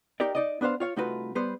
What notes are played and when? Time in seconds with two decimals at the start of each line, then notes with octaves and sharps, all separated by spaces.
0.20 D#4 G4 A#4 D5
0.35 D#4 D5 D#5
0.61 B3 D4 B4 C5 F5
0.80 F4 C#5 F5
0.96 C2 A3 D#4 F4 F#4 B4
1.35 G3 B3 B4 C5